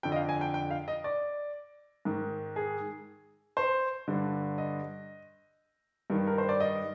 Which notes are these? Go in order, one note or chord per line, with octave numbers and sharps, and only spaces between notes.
F2 D3 G5
D#5
F5
G#5
G5
G5
F5
D#5
D5
G#2 D#3
G#4
C5
G2 D3
D#5
G2 D#3
A#4
C5
D5
D#5